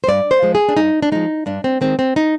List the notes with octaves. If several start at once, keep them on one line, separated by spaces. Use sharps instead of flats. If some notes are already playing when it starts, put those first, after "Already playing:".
C5
G2 D5
C5
F3 G#3
G#4
D4
G2 D#4
D4
F3 G#3 D#4
G2 D4
C4
D#3 G#3 C4
C4
D#4